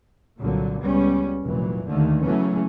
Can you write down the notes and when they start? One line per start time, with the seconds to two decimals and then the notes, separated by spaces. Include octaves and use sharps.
0.39 C2 A#2 D3 F#3 A#3
0.81 C#2 G3 B3 C#4
1.44 F1 A#2 E3 F#3
1.86 D#2 D3 D#3 A3
2.22 C#3 E3 F#3 A3 B3 C#4